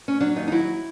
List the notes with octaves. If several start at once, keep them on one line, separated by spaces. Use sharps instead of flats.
C#4
F#3 D4
D#2 D#4
D#4
F#3 E4